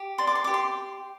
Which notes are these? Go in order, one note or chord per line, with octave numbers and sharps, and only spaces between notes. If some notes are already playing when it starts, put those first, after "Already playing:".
Already playing: G4
D5 C6
D6
C6
G4 D6
C6